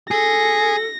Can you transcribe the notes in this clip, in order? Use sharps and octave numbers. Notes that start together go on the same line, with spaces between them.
G#4 A4 A#6